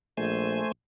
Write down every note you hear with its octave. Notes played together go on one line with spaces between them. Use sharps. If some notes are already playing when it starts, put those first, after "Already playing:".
A#1 A3 C5 G#5